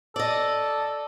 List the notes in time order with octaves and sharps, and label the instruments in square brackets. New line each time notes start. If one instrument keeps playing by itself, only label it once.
[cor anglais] A4 [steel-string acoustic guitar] D5 D#5